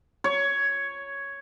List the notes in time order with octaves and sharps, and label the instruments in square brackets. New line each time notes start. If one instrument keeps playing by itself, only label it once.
[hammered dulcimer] C#5